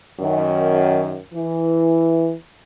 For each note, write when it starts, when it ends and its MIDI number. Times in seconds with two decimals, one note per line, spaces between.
0.20 1.17 42
0.20 1.17 51
1.34 2.33 52